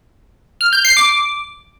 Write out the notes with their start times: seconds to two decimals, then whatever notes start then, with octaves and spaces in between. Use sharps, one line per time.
0.61 F6
0.73 G6
0.85 C7
0.97 D6